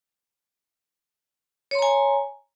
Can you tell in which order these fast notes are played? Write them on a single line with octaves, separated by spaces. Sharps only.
C#5 C6 A#5 G#5